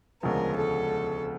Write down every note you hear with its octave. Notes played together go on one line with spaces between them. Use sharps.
E1 D2 C#3 F3 G#3 A#4
A4